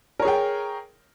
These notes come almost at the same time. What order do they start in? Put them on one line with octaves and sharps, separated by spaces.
A#4 C#5 G#4 G5